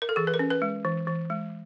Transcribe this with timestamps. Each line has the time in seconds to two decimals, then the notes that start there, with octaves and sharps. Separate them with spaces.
0.02 A#4
0.09 A4
0.16 E3 G#4
0.27 B4
0.34 A#4
0.39 C#4
0.50 B4
0.62 G#3
0.85 E3
1.07 E3
1.30 G#3